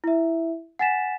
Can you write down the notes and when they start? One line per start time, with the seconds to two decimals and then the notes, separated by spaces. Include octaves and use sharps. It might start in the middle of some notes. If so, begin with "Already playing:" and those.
0.04 E4 E5
0.79 F#5 G#5 A6 B6 E7